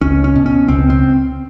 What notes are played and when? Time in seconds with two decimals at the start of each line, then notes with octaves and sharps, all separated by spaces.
0.01 C#2 C#4
0.24 C#4
0.36 B2
0.46 C#4
0.68 C#2 C4
0.90 C4